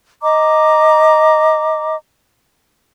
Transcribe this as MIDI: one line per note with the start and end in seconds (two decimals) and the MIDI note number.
0.22 1.94 75
0.22 1.94 82
0.22 1.94 86